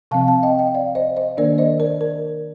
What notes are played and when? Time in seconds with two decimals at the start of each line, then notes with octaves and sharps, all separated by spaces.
0.11 C3 F3 C4 F5 A5
0.27 F5 A5
0.43 D#5 G5
0.59 D#5 G5
0.75 D5 F5
0.95 C5 D#5
1.16 C5 D#5
1.37 D#3 A#3 D4 A#4 D5
1.58 C5 D#5
1.80 A#4 D5
2.01 A#4